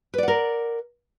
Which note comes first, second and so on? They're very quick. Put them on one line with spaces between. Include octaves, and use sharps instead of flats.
B4 D5 F#5 A#4